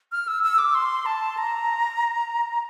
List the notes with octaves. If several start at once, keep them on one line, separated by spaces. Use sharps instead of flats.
F6
E6
E6
D6
C6
A5
A#5